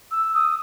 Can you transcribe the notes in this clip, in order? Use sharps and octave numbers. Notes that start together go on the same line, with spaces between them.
E6
D#6